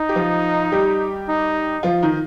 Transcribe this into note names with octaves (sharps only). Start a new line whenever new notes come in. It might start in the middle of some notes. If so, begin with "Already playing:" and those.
Already playing: D#4
G4
F3 F4
G3 G4
D#4
F3 F4
D#3 D#4